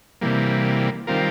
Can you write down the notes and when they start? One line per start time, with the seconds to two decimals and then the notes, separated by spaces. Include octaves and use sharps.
0.21 C3 E3 G3 A#3
1.07 D#3 G3 C4 F4 A#4